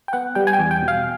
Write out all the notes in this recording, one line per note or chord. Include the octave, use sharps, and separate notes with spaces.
G5
B3 F#5
G3 G5
G#5
G5
E2
G5
B2
F5